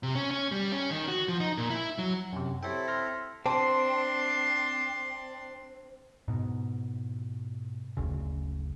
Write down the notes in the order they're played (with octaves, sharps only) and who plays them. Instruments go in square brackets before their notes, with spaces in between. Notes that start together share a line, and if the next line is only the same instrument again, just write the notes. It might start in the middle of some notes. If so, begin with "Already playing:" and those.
[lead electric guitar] C3
C#4
C#4
G3
C#4
D#3
F#4
F3
D#4
A#2
E4
F#3
[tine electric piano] F#2 C3
[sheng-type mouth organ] C4 E4 A4 [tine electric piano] G4 C#5 G5
[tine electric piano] C6 F6 A#6
[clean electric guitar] C4 [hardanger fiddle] D4 C6 [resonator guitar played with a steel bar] C5 [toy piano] A5
[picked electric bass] G#2 B2
F#1 D2 C#3